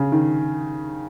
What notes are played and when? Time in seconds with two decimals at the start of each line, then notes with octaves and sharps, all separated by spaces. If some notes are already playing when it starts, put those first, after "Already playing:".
Already playing: C#3
0.12 D#3